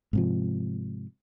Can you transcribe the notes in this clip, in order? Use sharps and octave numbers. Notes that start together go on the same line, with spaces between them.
G#2 C3 F3